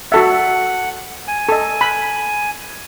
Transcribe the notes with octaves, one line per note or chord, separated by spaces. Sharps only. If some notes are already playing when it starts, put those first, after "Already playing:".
F#4 A4 E5 F#5
G#5
A4 D#5
B5